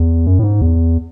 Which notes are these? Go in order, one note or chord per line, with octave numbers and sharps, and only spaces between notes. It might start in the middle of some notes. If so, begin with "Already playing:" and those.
Already playing: E2
F#2
A2
G#2
E2